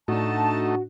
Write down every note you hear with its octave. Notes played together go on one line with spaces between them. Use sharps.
A2 A3 D4 D#4 F#4 A5